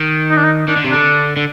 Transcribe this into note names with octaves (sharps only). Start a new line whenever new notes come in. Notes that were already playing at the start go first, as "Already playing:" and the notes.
Already playing: D#3
D#4
D4
D#4
D#3 D4
D3
C3
D3 D4
D3